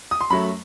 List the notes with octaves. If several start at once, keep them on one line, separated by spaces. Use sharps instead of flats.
D#6
C6
F#2 F#3 A3 B5